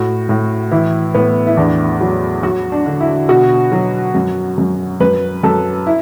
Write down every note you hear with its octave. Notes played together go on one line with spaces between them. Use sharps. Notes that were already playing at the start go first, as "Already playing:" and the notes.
Already playing: A2 F#4
A2
E3 E4
A2 B3
E4
E2 D4
F#3
F#3 F#4
D4
D3
E4
B2 F#4
F#3
F#2
F#2
F#2 B4
F#2 A4
E4